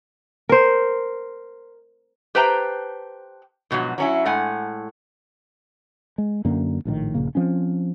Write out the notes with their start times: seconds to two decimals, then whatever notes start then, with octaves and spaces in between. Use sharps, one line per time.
0.49 A#4 C5
2.35 G4 B4 C5 G5 A5 A#5
3.71 G#2 B2 F3 F#3
3.98 F#3 C#4 E4
4.26 A2 G#3 F#5 G#5
6.18 G#3
6.45 F#2 D3 A#3
6.85 A#1 A2 D3 D#3
7.14 A#1 G2 C#3 A#3
7.35 F3 C4 C#4